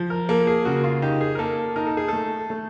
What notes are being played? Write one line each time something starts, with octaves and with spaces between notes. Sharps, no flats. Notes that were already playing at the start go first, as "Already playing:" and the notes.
Already playing: F3
A#4
A#3 A4
G#4
C#3 F#4
F4
D#4 G4
G#4
A#4
A#3 A4
D#4 A#4
A4
G#4
A3 A4
A3